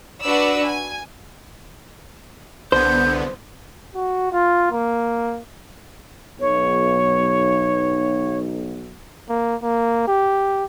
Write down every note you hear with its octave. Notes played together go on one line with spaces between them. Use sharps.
D4 F#4 B4 D5 E6
G#5
C2 D3 B3 C5 G6
F#4
F4
A#3
B1 C#5
A#3
A#3
G4